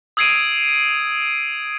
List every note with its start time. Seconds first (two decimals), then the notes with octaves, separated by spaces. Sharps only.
0.17 D#6 E6 G#6 C7 D7 D#7